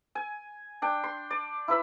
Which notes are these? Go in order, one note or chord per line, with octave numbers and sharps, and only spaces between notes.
G#5
D4 G5
C6
D5
E4 B4 E5 B5